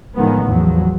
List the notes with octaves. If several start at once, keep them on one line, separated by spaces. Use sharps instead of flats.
A2 D#3 F3 G#3 B3
A1 E2 F3 F#3